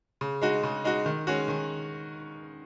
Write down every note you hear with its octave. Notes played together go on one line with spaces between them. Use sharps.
C#3
G#3 D#4 F#4
C#3
G#3 D#4 F#4
D#3
G#3 C#4 F#4
D#3